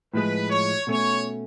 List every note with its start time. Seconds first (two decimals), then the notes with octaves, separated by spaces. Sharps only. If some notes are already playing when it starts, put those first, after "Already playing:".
0.13 A2 F3 G#3 B4
0.50 C#5
0.87 B2 A3 C#4 C#5